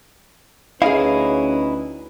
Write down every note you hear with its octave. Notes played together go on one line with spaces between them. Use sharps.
D2 C#4 D#4 E4 G#4 B4 F5